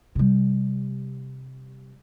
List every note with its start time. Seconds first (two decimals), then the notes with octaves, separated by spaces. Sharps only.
0.15 C3 G3